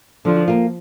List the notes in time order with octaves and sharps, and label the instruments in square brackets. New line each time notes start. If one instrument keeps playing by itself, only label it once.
[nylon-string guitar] D3 [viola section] F3
[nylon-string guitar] A#3 F4